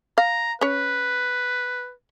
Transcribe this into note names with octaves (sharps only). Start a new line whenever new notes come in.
F5 A#5
C#4 B4 C#5